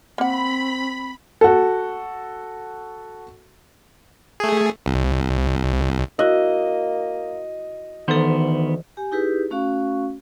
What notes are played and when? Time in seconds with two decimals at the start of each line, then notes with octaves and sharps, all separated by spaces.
0.18 A#3 C4 F#5 B5
1.41 F#4 A4
4.40 A3 G#4
4.86 C2
6.19 A#3 E4 F#4 D#5
8.08 D2 D#3 E3 B3 A4 C5
8.97 G4 G#5
9.12 D#4 E4 G4 G#4 B4
9.51 A3 C#4 F#4 F5 C#6